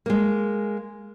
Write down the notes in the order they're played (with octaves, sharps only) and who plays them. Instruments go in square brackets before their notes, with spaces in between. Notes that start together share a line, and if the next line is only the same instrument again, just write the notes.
[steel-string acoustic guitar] G#3 A#3